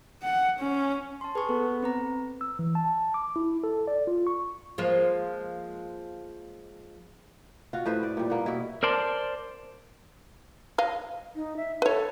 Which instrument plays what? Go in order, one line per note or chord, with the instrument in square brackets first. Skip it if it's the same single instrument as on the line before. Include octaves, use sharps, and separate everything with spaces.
[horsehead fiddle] F#5
C#4
[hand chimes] A5 C6
[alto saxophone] G#4 [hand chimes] B4 C#6
[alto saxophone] B3 [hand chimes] A4
[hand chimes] C4 B4 A#5
[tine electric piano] E6
E3
A5
D6
E4
A4
D5
F4
C#6
[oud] F3 G#3 A#3
[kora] F4 F#4
A2 B4 C5 E5
D5
A#2 G3
A#3 B3
B2 E4
[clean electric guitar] A#4 C5 D5 A5 C6
[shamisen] D#5 F5
[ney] D#4
E5
[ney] A4 [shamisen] B4 C#5